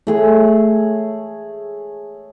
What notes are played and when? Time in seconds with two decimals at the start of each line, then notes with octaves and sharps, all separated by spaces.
0.07 A3 G#4 C#5